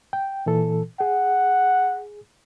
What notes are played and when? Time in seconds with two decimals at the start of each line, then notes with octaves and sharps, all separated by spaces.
0.13 G5
0.46 A#2 E3 A4
1.01 G#4 F#5